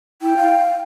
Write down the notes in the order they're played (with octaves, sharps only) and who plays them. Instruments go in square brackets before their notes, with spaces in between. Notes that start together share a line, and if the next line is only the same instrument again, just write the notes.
[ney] E4 [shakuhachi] G5
[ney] F5